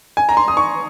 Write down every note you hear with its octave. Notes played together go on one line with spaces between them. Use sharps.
G#5
A#5
C6
D#6
C#6